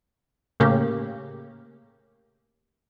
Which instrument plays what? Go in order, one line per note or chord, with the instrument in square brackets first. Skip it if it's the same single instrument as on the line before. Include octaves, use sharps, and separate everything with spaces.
[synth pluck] A2 C#3 A#3 C#4 G4